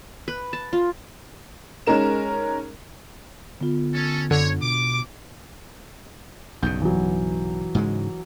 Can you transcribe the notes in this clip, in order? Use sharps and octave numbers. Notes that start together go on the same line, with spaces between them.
B4
A5
F4
G#3 C#4 D#4 A#4 E7
D3 B3 F4
C#4 A4
F#2 D3 C#5
B2 D6
B1 G2 C#3 G6
E3 F#3
G#2 C#3 G#3